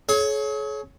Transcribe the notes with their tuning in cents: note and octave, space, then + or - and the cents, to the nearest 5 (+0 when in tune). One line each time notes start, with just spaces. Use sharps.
G#4 +45 C#5 +0